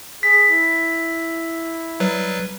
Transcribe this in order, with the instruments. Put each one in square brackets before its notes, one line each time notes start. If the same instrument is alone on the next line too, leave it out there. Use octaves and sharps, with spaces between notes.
[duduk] G#4 [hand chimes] B6
[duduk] E4
[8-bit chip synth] F#3 G3 B4